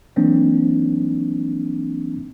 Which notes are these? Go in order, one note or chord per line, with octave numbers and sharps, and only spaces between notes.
E3 F#3 A#3 C4 D4 D#4